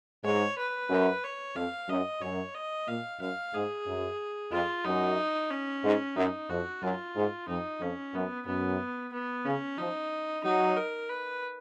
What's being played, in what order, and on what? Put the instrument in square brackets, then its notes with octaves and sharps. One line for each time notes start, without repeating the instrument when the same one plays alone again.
[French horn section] G#2 [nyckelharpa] C#5
[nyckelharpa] B4
[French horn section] F#2
[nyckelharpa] C#5
[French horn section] F2 [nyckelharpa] F5
[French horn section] F#2 [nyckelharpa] D#5
[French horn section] F#2 [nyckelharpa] C#5
[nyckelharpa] D#5
[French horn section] A#2 [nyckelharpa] F5
[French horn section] F#2 [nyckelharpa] F5
[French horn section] G#2 [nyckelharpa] G#4
[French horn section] F#2
[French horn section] F2 [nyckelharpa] F4
[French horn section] F#2 [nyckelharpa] D#4
[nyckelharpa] C#4
[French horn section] G#2
[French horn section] F#2 [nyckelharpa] D#4
[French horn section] F2 [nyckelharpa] F#4
[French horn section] F#2 [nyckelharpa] F4
[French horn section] G#2
[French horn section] F2 [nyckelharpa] D#4
[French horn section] F2 [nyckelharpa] C#4
[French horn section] F#2 [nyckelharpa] B3
[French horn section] F#2 [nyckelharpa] B3
[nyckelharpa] B3
[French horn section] C#3 [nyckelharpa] C#4
[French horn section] F3 [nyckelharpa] D#4
[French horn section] F#3 [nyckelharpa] D#4
[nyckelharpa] A#4
B4